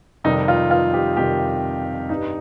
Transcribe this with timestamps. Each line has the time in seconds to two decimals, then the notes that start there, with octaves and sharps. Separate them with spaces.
0.24 F2 C3 D#3 G3 D#4
0.48 F4
0.71 F4
0.94 G4
1.16 F2 C3 D#3 G3 G4
2.09 G2 G3 D#4